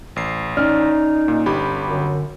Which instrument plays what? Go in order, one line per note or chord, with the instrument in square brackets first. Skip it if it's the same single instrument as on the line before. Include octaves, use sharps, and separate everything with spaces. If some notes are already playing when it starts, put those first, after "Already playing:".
[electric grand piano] A1 C7
[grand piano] C#4 D5 F6 [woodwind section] D#4
[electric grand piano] A#2
G1 G4 B5
[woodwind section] F#2 D3